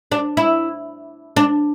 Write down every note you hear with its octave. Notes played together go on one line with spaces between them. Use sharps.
D4
E4
D4